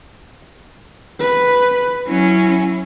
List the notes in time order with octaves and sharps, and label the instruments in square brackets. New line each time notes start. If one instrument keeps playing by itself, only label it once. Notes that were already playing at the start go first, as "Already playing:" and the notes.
[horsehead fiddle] B4
[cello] F#3 C#4 [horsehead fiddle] E4